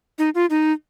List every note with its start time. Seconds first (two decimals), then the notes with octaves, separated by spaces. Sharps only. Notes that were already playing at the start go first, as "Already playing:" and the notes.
0.19 D#4
0.35 F4
0.50 D#4